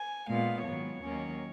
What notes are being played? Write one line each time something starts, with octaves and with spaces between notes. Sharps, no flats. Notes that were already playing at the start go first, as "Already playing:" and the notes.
Already playing: G#5
A#2 G#3 B3 F5
G#2 D#3 F#3 B3 C#5
D#2 D#3 F#3 A#3 C#4